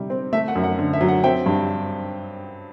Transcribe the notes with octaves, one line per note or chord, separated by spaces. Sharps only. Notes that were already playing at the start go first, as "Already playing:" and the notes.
Already playing: C3 G3
C4
A3 E5
F#5
F#2
F#5
D3
E5
F#3
F#5
C4 E5 G5
G2